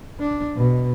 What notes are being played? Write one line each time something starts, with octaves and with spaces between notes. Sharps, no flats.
D4
B2